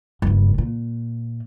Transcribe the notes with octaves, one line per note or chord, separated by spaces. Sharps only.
F#1 G2
A#2